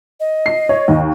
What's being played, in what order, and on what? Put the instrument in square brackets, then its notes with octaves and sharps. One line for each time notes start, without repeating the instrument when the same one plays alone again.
[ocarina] D#5
[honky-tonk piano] C7
C#5
D#2